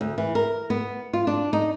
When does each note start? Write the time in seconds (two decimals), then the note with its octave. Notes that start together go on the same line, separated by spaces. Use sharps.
0.01 D2
0.18 E3
0.35 A#4
0.70 B3
1.13 F4
1.27 D4
1.53 D#4